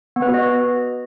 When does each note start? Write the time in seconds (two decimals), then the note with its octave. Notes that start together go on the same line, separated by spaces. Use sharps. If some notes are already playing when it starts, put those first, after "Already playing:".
0.16 B3
0.22 B4
0.28 F#4
0.34 D#5